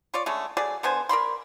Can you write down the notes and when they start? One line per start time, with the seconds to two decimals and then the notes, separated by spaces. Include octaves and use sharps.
0.14 F4 C#5 D5
0.26 D3 G#3 A3 C#4
0.57 F#3 A3 G#4 D5
0.83 D3 B3 C5 G#5
1.09 A#4 D5 B5 C6